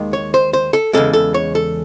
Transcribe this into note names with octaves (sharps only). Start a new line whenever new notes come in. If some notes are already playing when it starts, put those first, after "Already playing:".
Already playing: D#2 D#3 G#3
C#5
C5
C5
A4
E2 C#3 G#3 A4
A4
C#5
A4